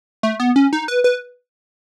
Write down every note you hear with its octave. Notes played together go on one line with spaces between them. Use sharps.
A3
B3
C#4
D#4
B4
B4